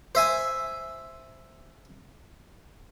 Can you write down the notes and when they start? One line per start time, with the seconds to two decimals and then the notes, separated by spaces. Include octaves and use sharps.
0.15 C5 E5 G#5